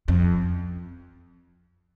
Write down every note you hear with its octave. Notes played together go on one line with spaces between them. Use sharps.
F2